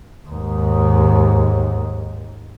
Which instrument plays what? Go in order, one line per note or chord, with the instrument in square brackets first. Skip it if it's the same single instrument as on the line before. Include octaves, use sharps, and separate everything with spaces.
[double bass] D#2 G#2